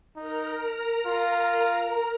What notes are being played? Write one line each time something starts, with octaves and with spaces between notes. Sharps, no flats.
D#4 A#4 A#5
A#4 A#5
F4